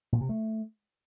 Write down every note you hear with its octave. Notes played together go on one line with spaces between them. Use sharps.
A#2
C3
A3